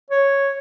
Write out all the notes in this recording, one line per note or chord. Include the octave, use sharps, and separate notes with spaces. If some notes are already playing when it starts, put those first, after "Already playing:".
C#5